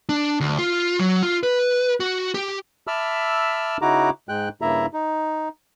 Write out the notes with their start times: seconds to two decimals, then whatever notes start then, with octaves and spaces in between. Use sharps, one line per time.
0.09 D4
0.41 D2
0.58 F4
0.99 F#3
1.23 F4
1.43 B4
2.00 F#4
2.34 G4
2.87 E5 A5 B5 D6 E6 F6
3.82 C#3 D#4 E4 F#4 A#5 D6
4.29 G#2 G#3 G5 F#6
4.62 G2 C#3 A#3 E4 E5 A#5
4.93 D#4